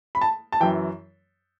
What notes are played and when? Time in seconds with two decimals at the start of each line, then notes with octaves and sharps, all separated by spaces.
0.15 B5
0.21 A5
0.52 A5
0.60 F#2 E3 G5